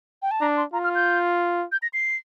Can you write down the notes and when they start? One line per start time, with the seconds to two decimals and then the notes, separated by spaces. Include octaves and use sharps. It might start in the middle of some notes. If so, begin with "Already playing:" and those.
0.22 G5
0.31 A5
0.41 D4 A#5
0.57 C6
0.73 F4 A#5
0.84 F6
0.95 G6
1.72 G6
1.82 A#6
1.93 C7